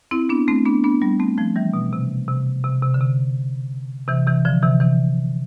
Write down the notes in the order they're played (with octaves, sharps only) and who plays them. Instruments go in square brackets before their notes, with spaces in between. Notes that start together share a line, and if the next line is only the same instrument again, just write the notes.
[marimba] C4 E4
B3 D4
A3 C4
B3 D4
B3 D4
G3 B3
A3 C4
F3 A3
E3 G3
B2
C3
C3
C3
C3
D3
C3
C3 E3
C3 E3
D3 F3
C3 E3
C3 E3